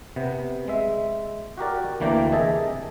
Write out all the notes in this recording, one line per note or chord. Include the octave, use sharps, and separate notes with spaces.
C3 B3
G#3 E5
F#4 G4 A#4 D5
D2 E3 A#3 D5 G5 A#5
C3 G#4 D#5 E5 A5